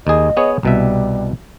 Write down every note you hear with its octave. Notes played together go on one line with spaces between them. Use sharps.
D#2 G#4 D#5
B3 G#4 C#5
C2 B2 G3 E5